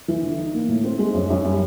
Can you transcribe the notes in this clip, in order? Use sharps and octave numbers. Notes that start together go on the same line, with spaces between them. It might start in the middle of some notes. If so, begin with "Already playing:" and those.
E3
D3
D#4
A#3
A2
C4
G#3
F#2
F#2
G3